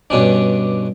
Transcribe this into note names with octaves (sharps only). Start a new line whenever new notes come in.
G2 B2 C#4 D4